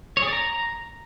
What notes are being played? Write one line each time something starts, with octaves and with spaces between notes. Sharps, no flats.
C#5
G#4
D5
A#5